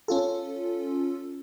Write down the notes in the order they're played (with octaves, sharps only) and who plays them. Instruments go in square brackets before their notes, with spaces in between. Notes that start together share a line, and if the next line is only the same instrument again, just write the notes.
[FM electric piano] C#4 F4 A4